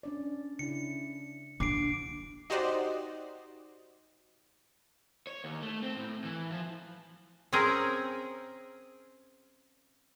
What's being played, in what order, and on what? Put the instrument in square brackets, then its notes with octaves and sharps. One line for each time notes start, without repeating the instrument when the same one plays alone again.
[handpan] C#4 D4 D5
[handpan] C#3 D4 E4 [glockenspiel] C#7
[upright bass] D3 [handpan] F#3 [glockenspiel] D6 C7 D7
[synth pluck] D#4 F#4 G4 C5 D5 D#5
[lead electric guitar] C#5
D#2
A3
C4
A2
E3
F3
[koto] C4 C#4 G#4 A#4